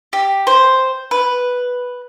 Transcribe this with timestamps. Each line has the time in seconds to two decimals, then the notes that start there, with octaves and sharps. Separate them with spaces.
0.13 G4
0.47 C5
1.11 B4